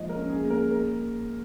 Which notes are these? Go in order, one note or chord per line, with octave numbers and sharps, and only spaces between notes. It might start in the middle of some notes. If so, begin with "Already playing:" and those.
Already playing: G#2 F3 A#3 D#5
A#4
C#4
G#4
A#3
A#4
A#3 A#4